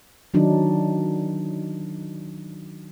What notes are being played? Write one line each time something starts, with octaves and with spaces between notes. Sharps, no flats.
D#3 F#3 D4 D#4